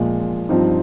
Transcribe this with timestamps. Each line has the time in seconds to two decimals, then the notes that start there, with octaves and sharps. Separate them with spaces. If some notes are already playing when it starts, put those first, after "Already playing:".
Already playing: A#2 F3 G#3
0.49 G2 F3 C4 D#4